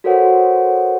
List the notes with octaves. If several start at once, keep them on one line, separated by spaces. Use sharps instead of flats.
F#4 A4 A#4 C5 C#5 F#5